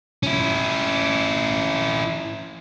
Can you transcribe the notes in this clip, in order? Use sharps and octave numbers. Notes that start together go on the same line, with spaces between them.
C#4 E4